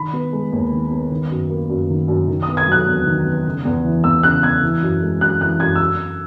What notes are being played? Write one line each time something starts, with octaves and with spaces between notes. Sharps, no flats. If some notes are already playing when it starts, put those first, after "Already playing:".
Already playing: D#3 B5
B3
G#3
D#2
D#3
B3
D#3
F#2
A#3
F#2
D#3
F#2
D#3
D#6
B3
G#6
F#3 F#6
E2
D#3
B3
C#3
E2
E3
E2 E6
C#3 F#6
E2 G#6
E3
F#2
G#3
F#2 F#6
E3 F#6
F#2 G#6
E6